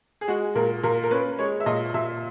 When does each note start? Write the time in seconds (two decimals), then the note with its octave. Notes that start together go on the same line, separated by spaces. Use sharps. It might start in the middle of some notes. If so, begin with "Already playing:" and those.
0.21 G#4
0.28 G#3 F#4
0.55 A#2 A#4
0.83 A#2 A#4
1.04 A#4
1.11 C#4 B4
1.39 G#3 C#5
1.60 E5
1.66 A#2 D#5
1.94 A#2 E5